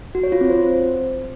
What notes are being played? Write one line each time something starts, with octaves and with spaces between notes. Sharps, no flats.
F#4
C#5
F4
C4
C5